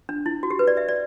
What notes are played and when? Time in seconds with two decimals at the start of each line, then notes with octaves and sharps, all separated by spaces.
0.09 D4
0.26 E4
0.43 F#4
0.50 G4
0.59 B4
0.67 D5
0.77 E5
0.89 D5